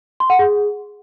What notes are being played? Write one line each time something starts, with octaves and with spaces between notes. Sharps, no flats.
C6
F#5
G#4